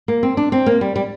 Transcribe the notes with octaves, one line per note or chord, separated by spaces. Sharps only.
A#3
C4
D4
C4
A#3
G3
G3